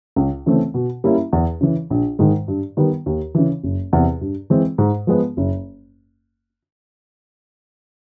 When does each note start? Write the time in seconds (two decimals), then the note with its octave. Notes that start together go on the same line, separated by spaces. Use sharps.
0.16 C#2
0.46 C#3 E3 A3 C4
0.74 B2
1.04 G3 A#3 C#4 E4
1.33 E2
1.61 C#3 E3
1.90 A#1
2.19 G#2 D#3 G#3
2.48 G2
2.77 D#3 G3 B3
3.06 D#2
3.35 C#3 E3
3.63 F#1
3.93 E2 C3
4.21 G2
4.50 E3 G#3 C4
4.78 G#2
5.07 F3 G#3 B3
5.37 F#1